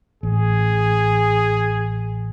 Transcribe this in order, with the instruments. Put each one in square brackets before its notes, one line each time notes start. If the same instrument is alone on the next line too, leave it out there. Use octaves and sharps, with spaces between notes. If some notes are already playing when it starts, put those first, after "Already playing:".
[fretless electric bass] A1 [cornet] G#4